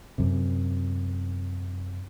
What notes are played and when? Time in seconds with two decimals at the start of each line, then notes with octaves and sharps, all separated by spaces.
0.18 F#2 C3